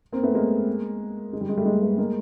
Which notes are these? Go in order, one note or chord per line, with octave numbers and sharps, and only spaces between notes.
A#3 C4
A3 B3
G#3 A#3
G#3
G3
G#3
G3 A3
G#3 A#3
A3 B3
G#3 A#3